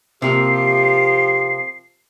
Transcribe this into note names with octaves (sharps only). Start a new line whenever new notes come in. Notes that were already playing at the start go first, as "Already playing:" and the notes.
C3 F3 A#3 G4 C7